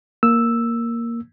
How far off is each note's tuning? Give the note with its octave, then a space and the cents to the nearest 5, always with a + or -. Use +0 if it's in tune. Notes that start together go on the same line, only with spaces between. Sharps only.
A#3 +0 E6 +0